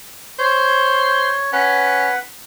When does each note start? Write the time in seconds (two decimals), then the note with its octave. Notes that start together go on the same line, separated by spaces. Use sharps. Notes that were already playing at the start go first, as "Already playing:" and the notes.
0.39 C5 C#5
1.53 C#4 B4 F#5